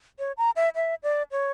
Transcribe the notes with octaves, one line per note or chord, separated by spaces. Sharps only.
C#5
A#5
E5
E5
D5
C#5